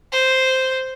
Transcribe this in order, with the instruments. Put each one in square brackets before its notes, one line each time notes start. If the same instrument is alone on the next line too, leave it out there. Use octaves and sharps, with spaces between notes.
[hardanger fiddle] C5